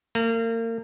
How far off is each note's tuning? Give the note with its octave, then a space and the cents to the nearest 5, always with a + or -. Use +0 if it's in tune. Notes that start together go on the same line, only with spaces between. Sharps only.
A#3 -35